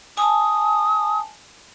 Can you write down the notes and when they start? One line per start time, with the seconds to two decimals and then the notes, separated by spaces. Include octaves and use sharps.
0.17 G#5 A5 D#6